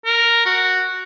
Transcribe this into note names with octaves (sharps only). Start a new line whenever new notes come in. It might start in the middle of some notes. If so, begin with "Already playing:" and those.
A#4
F#4